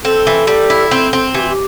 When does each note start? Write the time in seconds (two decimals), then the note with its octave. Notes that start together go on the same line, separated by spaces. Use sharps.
0.04 C4 A4
0.27 E3
0.47 G3
0.70 E4
0.91 C4
1.13 C4
1.34 E3 G4
1.42 F#4
1.49 G4